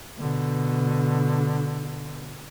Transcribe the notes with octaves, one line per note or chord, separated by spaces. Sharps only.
B2 D3